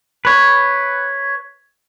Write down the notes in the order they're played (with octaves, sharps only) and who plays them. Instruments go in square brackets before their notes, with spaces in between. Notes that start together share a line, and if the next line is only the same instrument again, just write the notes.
[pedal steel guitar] B4 C#5